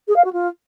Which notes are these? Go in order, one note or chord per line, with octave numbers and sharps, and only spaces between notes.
G#4
F5
F#4
F4